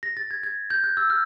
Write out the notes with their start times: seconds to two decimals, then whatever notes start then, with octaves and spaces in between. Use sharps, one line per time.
0.03 A#6
0.17 A6
0.31 G#6
0.43 G#6
0.70 G6
0.84 F#6
0.97 E6
1.10 F6